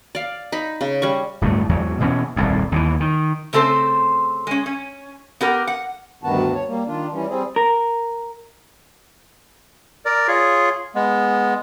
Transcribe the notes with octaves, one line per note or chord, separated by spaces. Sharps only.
D5 F5
D#4 B5
C#3
G3 C#4 C#6
D1 G2 G3 A3
E2 G#2 E3 F#3
B2 E3 F#3 C#4
D#1 C2 F2
D#2 C#3 E3
D#3
C#3 A3 C4 A4 C5
G#3 C#4
C#4
B3 G4 A#4
F#5
D2 G2 D#3 B3 F#4 A5
C#5
G3 A#3
D#3 D4 F4
E3 G3 C#4
G3 C4 G#4
A#4
A#4 D5
F4 G#4 C#5
G#3 B3